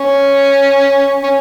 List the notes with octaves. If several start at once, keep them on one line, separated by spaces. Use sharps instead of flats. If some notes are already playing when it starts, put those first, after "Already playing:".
Already playing: C#4
C#4